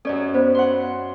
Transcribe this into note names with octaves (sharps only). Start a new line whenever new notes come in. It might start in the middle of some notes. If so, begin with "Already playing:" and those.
F#2 C#4 A4 D5 D#5
B3 C5
F#4 F#5 C6